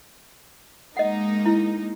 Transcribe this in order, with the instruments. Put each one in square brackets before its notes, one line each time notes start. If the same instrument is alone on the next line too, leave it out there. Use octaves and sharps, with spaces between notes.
[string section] G#3 A#3 D#4 [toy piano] D#5 F#5
[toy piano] E4